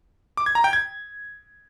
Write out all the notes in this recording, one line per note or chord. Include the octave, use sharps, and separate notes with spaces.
D6
G#6
A#5
G5
G#6